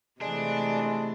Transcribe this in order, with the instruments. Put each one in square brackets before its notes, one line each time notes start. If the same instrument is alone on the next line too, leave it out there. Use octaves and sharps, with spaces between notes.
[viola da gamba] C3 E3 A3 [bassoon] G#3 [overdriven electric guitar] D4